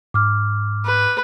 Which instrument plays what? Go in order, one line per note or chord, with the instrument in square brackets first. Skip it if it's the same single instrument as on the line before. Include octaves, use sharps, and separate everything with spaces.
[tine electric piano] G#2 [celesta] D6 F6
[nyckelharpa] B4